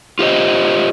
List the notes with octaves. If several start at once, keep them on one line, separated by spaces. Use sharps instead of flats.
F4 G4 C5 D#5